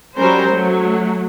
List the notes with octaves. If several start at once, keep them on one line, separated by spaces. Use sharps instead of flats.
F#3 G3 C#4 A#4 C5
F#3 A3